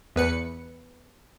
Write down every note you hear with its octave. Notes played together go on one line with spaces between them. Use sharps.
E2 B4 C#7